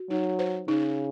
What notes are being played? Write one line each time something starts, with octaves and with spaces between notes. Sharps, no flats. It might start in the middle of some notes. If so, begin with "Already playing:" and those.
Already playing: F#4
F#3 D#4
C5
C#3 D#4